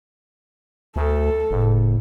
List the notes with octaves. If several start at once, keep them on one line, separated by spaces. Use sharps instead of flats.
D2 A4
F#1 A2